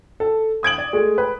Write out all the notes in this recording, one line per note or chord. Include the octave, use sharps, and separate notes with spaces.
A4
D#6 G#6 D7 F#7
D5
G#3 A3
B4